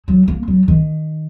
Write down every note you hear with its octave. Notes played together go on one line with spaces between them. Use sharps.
F#3
A#3
F#3
D#3